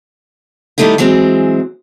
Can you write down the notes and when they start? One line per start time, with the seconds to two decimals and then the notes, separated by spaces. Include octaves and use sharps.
0.78 D#3 E3 G3 A3 D#4 E4
0.98 E3 F#3 G#3 C4